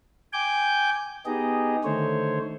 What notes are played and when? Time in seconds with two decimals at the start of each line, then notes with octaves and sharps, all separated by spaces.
0.33 G5 G#5 D6 G6
1.26 B3 D#4 G4 G#4 D#5
1.84 D3 D#3 A3 C5 C#5